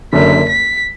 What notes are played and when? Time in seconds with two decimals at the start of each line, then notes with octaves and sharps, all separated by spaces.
0.13 F#1 F#2 D3 B6
0.49 B6